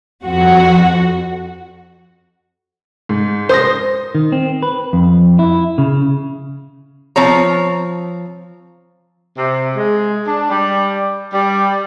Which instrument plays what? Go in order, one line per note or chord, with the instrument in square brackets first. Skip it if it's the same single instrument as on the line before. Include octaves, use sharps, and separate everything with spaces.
[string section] F2 F#4
[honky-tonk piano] G#2
[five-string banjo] C5 [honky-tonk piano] C6 D#6 A#6
[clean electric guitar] D#3
C4
B4
F2
E4
C#3
[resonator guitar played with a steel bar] F3 C4 C#5 A#5
[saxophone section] C3
G#3
D4
G3
G3